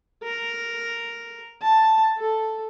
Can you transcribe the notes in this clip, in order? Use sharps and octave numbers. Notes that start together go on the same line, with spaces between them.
A#4
A5
A4